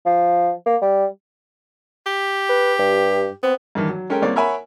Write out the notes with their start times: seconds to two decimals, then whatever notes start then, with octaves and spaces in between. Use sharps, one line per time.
0.06 F3
0.66 A#3
0.82 G3
2.06 G4
2.49 B4
2.79 G2
3.43 B3 C4
3.75 G2 D#3 E3
3.89 F#3
4.10 G#3 C#4 A4 A#4 G5
4.22 C2 A#3 C4 C#5 D5
4.36 A#4 C#5 E5 F#5 G#5 B5